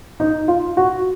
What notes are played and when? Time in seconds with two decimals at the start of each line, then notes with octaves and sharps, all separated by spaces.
0.20 D#4
0.48 F4
0.77 F#4